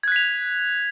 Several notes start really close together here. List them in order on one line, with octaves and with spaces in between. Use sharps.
G#6 F#6 B6 F7